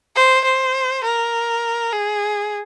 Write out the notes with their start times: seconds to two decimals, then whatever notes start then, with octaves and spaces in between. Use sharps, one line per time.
0.16 C5
0.45 C5
1.04 A#4
1.92 G#4